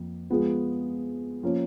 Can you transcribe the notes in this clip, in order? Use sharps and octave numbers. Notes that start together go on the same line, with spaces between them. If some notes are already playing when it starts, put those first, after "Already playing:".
Already playing: F2 A#3
F3 G#3 B3 F4 G#4
F3 A#3 C#4